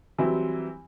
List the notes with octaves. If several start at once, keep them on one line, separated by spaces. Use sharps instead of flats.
E3 F#3 G3 C4 E4